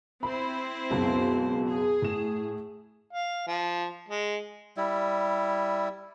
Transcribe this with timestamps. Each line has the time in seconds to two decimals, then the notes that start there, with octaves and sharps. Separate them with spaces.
0.23 C4 E4 C5 B5
0.91 C#2 F#2 B2
1.68 G#4
2.02 A2 E7
3.13 F5
3.47 F3
4.09 G#3
4.77 G3 E4